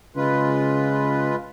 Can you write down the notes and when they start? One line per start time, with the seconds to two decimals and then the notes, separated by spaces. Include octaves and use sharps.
0.16 C#3 G#3 F4 B4